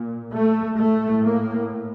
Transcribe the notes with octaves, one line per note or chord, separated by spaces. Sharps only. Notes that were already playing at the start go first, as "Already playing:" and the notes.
Already playing: A#2
A3
A2 A3
A#3